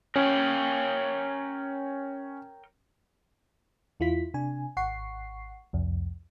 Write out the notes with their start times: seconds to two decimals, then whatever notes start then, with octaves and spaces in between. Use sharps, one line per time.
0.16 C#4 A#4 C#5 G5
4.00 E2 E4 F4 B6
4.34 C3 D4 G#5
4.77 G#1 F#5 C#6 C7
5.73 C2 F2